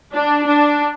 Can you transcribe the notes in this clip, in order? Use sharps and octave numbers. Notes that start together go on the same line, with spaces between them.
D4
D4